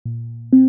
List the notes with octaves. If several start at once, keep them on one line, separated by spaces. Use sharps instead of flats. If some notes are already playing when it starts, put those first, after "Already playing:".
A#2
C4